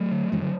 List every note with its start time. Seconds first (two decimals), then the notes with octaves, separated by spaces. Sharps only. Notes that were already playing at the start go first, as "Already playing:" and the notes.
Already playing: F#3 A3
0.12 D3
0.32 F#2 E3 G#3
0.42 D3 F#3